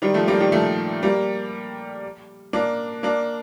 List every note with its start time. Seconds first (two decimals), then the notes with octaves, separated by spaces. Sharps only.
0.02 D#3 G3
0.14 F3 A3
0.27 G3 A#3
0.40 D#3 G3
0.52 F3 A3
1.03 G3 A#3
2.53 A#3 D4
3.03 A#3 D4